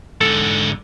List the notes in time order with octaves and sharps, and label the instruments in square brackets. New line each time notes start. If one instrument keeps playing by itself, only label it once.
[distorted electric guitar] G#2 D3 [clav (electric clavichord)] A4